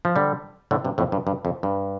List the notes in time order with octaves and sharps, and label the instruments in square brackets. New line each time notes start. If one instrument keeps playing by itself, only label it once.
[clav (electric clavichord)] F3
D3 G3
A2 D3
G2 C3
F2 A2
G2
G2
F2
G2